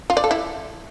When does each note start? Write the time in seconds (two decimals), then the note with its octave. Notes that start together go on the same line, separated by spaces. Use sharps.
0.10 F4
0.17 D5
0.24 A4
0.31 E4